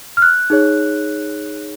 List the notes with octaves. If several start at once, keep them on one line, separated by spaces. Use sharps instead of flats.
F6
F#6
D#4 G#4 C#5